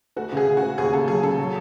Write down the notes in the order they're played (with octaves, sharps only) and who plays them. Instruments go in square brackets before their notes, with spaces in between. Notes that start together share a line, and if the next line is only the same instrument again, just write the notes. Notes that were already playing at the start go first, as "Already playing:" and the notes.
[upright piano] A3 [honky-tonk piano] F#4
[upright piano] C#3 [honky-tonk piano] G#4
[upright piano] C#3
[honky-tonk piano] F#4
[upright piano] A3
[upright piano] D#2 [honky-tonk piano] G#4
[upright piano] C#3 [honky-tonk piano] A4
[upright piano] F#3 [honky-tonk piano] G#4
[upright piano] C#3 [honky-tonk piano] A4
[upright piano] F#3